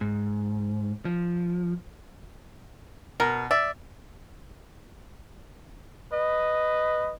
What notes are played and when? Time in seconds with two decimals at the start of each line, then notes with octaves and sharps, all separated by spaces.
0.01 G#2
1.05 F3
3.20 B2 A#4
3.51 D5 E5
6.12 B4 D#5